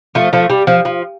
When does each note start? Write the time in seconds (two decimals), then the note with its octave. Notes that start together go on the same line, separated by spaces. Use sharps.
0.15 F3 A3
0.33 F3 A3
0.50 G3
0.67 F3
0.85 F3